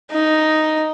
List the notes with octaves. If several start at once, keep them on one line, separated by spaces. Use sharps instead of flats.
D#4